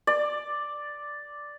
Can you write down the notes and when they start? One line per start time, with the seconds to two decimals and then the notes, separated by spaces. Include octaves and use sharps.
0.07 D5